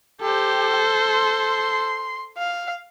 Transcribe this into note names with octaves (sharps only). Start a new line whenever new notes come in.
G4 A4 C5
C6
F5